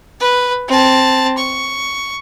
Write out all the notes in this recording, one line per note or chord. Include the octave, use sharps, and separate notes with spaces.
B4
C4 A5
C#6